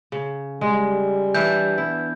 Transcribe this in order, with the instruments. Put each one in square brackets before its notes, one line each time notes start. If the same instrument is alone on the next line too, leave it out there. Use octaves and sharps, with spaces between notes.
[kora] C#3
[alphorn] G3 [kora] G#3
[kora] E3 D4 E5 [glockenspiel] G6
[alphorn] B3 [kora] E4